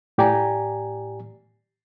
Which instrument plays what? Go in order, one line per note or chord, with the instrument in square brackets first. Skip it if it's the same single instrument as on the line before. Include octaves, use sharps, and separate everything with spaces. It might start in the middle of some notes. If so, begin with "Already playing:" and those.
[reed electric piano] A2 G4 D5 G#5 A#5